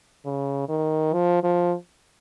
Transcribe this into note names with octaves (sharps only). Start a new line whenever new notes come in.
C#3
D#3
F3
F3